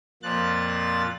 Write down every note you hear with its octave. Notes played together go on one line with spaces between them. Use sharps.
F2 A#2 F3 F#6 A6